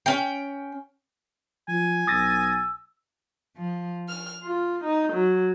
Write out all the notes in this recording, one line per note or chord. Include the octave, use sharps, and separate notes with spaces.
C#4 G5
F3 G#5
B1 D#6 E6 A6 A#6
F3
F6
F4
D#4
F#3